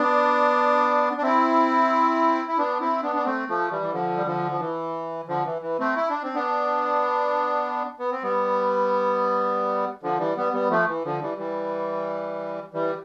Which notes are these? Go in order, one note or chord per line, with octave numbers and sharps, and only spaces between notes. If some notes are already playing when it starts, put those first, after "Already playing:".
Already playing: B3 D4
D4
C4 E4
E4
B3 D4
C4 E4
B3 D4
D4
A3 C4
F3 A3
E3 G3
E3
D3 F3
G3
D3 F3
F3
E3
D3 F3
E3
E3
A3 C4
E4
D4
C4
B3 D4
B3
C4
G3 B3
D3 F3
E3 G3
G3 B3
G3 B3
F3 A3
E3
D3 F3
E3 G3
E3 G3
E3 G3